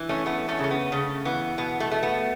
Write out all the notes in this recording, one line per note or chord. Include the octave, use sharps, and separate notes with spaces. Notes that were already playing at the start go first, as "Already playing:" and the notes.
Already playing: E3
A3 C#4
A3 B3
A3 C#4
C#3
C#4
B3
C#3 A3
E3 B3
B2 B3
A3
A3
B3